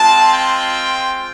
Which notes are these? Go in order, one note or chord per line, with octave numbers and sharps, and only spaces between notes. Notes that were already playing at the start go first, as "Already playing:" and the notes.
Already playing: G#3 C4 F4 A5
G5